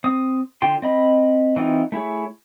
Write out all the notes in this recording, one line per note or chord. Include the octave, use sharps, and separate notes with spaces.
C4 D#6
D3 F4 G5 C6
C4 D#5 B5
E3 C4 D#4 F4
A3 E4 G#4 C#5